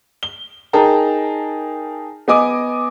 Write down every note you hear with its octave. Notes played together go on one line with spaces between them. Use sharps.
G7
D#4 G#4 A#4 G5 A5 A#5
B3 D#5 G#5 D6 D#6